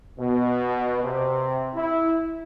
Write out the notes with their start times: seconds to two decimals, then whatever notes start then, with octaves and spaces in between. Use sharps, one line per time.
0.19 B2
1.03 C3
1.75 E4